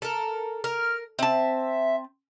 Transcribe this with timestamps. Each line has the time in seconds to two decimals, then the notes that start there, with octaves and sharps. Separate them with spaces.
0.02 A4 A#4
0.64 A#4 F6
1.19 C4 E5 A5